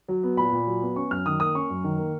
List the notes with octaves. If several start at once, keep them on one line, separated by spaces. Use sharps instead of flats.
F#3
B3
A#2 B5
A#2
F#3
B3
C#4 C#6
F#2 F6
D#3 D#6
A#3 D#6
C#4 C#6
F#2
D#3
A#3